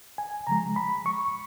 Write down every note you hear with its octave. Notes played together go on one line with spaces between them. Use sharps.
G#5
C#3 F3 G#3 A#5
B5
C#6